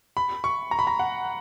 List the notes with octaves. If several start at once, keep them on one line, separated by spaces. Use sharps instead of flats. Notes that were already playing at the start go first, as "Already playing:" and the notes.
B5
C#6
A#5
B5
A#5
F#5